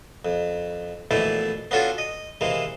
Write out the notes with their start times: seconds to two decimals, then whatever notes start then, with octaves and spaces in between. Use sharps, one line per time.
0.25 F2
1.11 A#1 B2 E3 A3 E4 D5
1.71 B3 C#4 D4 F4 F#4 A4
1.98 D#5
2.41 C3 E3 G#3 A#3